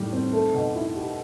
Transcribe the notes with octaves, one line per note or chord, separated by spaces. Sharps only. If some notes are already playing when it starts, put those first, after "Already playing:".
Already playing: A2 E3 G3
C4
A3
B2
E4
G4